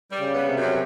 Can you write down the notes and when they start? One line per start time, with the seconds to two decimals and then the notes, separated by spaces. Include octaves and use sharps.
0.11 G3
0.19 C#3
0.34 B3
0.49 C3
0.57 F#2